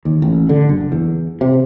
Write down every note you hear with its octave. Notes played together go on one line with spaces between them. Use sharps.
D#2
A1
D3
F#1
E2
C3